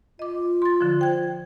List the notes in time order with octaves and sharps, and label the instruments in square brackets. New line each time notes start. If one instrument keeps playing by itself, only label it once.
[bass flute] F4 [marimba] D#5 D6
[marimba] C6 A6
D3 F3
C5 G5 G#6